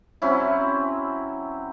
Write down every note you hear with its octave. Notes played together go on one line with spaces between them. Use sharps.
F#3 C4 C#4 E4